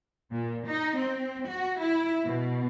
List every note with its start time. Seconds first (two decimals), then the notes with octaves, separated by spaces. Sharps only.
0.32 A#2
0.68 D#4
0.97 C4
1.48 F#4
1.79 E4
2.26 B2